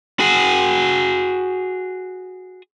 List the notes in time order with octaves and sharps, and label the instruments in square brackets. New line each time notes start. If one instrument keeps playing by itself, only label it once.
[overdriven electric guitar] F#4 G#4